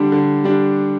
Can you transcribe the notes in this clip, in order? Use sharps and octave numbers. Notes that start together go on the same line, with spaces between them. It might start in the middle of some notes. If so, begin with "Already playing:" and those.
Already playing: D3 G3 D4
D3
G3 D4